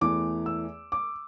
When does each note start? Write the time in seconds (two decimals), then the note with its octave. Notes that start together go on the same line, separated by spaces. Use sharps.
0.01 E2 E3 A3 D6
0.46 E6
0.92 D6